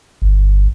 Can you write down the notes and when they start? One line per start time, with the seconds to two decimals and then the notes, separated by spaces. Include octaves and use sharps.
0.22 G1